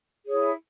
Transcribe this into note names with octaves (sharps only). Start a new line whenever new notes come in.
E4 G#4 C#5